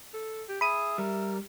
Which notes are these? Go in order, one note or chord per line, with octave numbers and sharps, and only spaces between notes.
A4
G4
G#4 E5 B5 D#7
G3 A#4